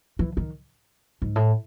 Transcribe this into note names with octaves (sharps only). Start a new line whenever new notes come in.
E3
D#3
G#2
A2